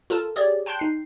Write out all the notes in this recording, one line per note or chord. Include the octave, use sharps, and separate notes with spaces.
F4 A4 A#4 A5
G4 G#4 C#5 D5
G5 A5 C6 F#6 G6
D#4 C7